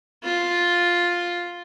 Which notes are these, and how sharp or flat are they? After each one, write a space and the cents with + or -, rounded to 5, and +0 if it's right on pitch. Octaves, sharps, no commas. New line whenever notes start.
F4 +5